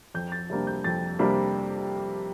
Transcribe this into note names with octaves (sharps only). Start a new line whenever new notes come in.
F2 G6
A6
C3 G3 A#3 D4
G6
F2 A6
C3 G3 A#3 D4